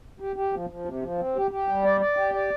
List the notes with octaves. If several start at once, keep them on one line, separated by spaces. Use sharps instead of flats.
G4
G4
F3
F3
C3
F3
C4
G4
G4
G3
D5
D5
G4
D5